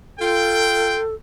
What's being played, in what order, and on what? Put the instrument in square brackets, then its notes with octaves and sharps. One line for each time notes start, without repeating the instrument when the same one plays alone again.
[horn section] F4 G5 [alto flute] A4